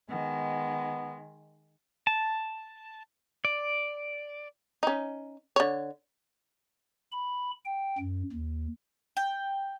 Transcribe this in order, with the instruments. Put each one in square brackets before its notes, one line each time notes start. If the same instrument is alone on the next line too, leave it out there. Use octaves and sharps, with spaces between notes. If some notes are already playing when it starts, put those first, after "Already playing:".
[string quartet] D#3 G#3 [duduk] B3
[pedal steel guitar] A5
D5
[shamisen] C#4 D#4
D3 C#5
[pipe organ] B5
G5
F#2
D#2
[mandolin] G5